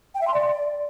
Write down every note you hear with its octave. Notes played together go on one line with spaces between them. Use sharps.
G5
E5
C6
D5